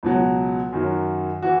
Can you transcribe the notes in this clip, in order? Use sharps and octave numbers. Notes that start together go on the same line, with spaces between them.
C#2 B2 F#3
F#2 D#3 F#3
E3 F#4